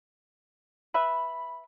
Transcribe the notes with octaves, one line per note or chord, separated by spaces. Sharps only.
B4 E5 B5